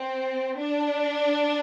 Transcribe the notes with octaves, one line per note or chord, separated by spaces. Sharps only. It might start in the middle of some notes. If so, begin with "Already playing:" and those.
Already playing: C4
D4